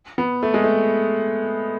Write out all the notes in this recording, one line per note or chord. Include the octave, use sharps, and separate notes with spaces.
B3
A3
G#3
A3